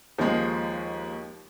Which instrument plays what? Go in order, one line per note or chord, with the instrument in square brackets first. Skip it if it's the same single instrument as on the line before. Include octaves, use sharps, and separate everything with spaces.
[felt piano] D#2 [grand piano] F3 G#3